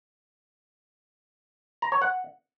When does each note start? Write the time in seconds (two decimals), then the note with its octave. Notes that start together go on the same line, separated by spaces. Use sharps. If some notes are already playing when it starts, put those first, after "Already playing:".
1.82 A#5
1.92 C#5
2.02 F#5